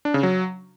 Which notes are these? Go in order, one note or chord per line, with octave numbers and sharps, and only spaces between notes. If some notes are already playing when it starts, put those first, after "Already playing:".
D4
C#3
F#3